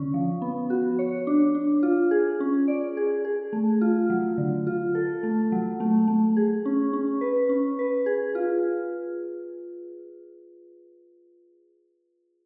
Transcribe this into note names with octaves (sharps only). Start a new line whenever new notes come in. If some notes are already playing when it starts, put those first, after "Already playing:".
Already playing: D3 C#4
F3
B3
F#4
C#5
D4
D4
F4
G#4
C#4
D5
G#4
G#4
A3
F4
F#3
D3
F4
A4
A3
F#3
A3
A3
G#4
C#4
C#4
B4
C#4
B4
G#4
F4